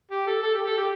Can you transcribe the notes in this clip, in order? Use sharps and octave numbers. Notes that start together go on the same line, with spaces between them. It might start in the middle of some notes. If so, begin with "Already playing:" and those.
G4
A4
A4
G4
A4
G4